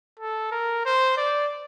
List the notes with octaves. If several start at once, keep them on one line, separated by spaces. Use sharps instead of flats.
A4
A#4
C5
D5